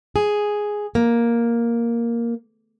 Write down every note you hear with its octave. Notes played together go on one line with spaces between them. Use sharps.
G#4
A#3